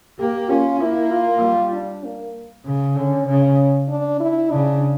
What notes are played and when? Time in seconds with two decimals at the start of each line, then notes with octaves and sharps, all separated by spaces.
0.19 A#3 G4
0.49 C#4 F4
0.80 A#3 E4
1.11 F4
1.42 G3
1.73 D4
2.04 A#3
2.65 C#3
2.96 D3 C#4
3.27 C#3 C#4
3.89 D4
4.20 E4
4.51 C#3 D4